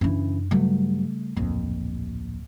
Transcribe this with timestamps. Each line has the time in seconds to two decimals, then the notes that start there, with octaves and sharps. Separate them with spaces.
0.01 F#2 C#3 E3 D4
0.51 G2 C#3 F#3 G3 A3
1.36 D1 A#1 F2